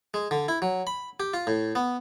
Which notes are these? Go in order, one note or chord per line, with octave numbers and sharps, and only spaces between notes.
G#3
D3
E4
F#3
B5
G4
F4
A2
B3